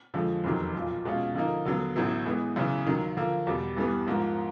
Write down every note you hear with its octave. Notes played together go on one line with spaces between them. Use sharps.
F2 D3 F3 G#3
F1 E2 C3 D#3 F#3
B1 A#2 F3
B2 G#3 C#4 F4
D3 F3 A#3 D#4
D#2 D3 F#3 B3
A1 A2 F#3 B3 E4
E3 G#3 B3
F#2 C#3 E3
D#2 D#3 F#3
D3 F3 A#3
E2 B2 G3
G2 E3 G3 B3
A#1 G#2 F3 A#3